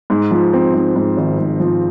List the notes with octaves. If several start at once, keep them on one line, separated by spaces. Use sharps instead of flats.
G#2
F3
C4
G#2
G#2
G#1
G#2
F3